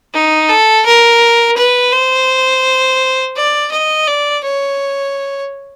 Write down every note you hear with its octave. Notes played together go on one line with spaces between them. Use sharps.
D#4
A4
A#4
B4
C5
D5
D#5
D5
C#5